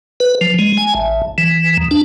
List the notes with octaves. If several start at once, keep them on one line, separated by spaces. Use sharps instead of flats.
B4
F3
G#3
G#5
A1
E3
D#2
D4